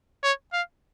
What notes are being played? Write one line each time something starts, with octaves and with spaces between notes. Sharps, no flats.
C#5
F5